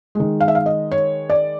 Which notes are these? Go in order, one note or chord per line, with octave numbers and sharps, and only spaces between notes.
D#3 G#3
F5
E5
F5
D#5
C#5
D5